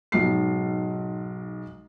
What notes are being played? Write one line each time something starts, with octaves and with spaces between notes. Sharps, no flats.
B1 G#2 C7